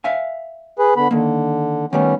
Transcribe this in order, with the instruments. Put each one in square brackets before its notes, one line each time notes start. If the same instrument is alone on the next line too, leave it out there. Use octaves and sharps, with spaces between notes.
[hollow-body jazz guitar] E5 F5 G#5
[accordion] G#4 B4
D3 B3 B5
[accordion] D3 [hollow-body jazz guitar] D#3 A#3
[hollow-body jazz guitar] D#3 G3 A3 [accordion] B3 C#4